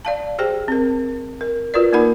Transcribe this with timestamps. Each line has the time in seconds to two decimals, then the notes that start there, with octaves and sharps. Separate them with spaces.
0.05 D5 F5 A5
0.39 G4 G#4 C5 G5
0.68 C4 A#4
1.41 A#4
1.74 F4 F#4 A#4 B4 D5
1.93 A#3 D#4 A#4 F#5 B5